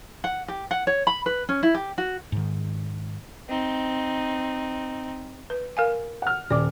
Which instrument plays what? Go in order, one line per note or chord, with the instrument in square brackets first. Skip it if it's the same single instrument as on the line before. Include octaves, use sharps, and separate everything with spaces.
[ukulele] F#5
G4
F#5
C#5
B5
B4
C#4
E4
G4
F#4
[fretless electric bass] G#2 D#3
[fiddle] C4 D#4
[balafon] B4
A#4 F5 G#5
[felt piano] F#5 F6
[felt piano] D#1 [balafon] D5 D6